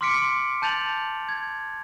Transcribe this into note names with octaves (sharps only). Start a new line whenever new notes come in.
C6 D6 F6 B6 C#7 D7
C6
A5 G6 A6 F7 F#7
G#6